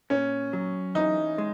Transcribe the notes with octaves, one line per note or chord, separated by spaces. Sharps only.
A#2 C#4
F#3
E3 D#4
G#3